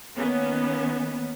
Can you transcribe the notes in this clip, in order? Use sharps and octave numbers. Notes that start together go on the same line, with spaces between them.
D#3 A#3 B3 C#4